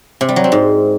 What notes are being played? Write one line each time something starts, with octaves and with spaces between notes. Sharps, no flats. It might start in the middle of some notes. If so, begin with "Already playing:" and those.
C3
G3
F#3
C4
G#2